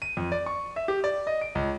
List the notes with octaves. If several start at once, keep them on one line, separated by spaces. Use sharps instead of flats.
D#7
F2
D5
C#6
E5
G4
D5
D#5
D7
C#2